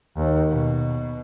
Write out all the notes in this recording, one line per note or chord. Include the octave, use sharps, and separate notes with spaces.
D#2
B2